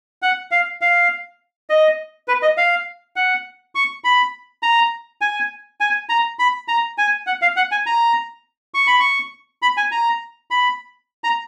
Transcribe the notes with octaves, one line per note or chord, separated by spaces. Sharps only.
F#5
F5
F5
D#5
B4
D#5
F5
F#5
C#6
B5
A#5
G#5
G#5
A#5
B5
A#5
G#5
F#5
F5
F#5
G#5
A#5
C#6
B5
C#6
B5
G#5
A#5
B5
A#5